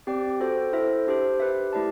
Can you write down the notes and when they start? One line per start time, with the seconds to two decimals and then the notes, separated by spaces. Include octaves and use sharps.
0.07 C4 G4 D5 G5
0.40 F#4 A4 C5 G5
0.73 E4 A4 C5 E5
1.07 D4 G4 C5
1.40 G4 B4 E5
1.73 A3 E4 G4 D5 A5